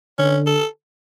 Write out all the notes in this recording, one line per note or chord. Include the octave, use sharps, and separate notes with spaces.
D3 C#4
A4